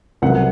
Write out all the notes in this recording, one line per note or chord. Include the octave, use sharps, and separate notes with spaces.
C2 C3 F#3 F#5